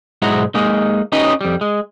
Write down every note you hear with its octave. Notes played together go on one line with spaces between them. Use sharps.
B1 G#2 G#3 E4 F#4 A#5
G#3 A#3 D#4
C#4 D#4 G4 B4 C#5 D#5
F2 G3
G#3